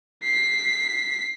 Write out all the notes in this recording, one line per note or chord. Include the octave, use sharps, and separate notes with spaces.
B6 C7